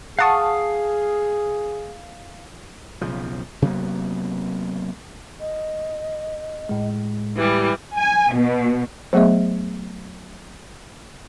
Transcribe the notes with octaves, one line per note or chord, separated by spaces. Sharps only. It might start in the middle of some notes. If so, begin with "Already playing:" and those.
G#4 F5 F#5 A5 C#6 D#6
B1 C#3 F3
C3 F#3 A#3 B3
D#5
A2 G#3
E3 G3 G4
G#5
B2
F#3 A3 B3 G#4 D#5 E5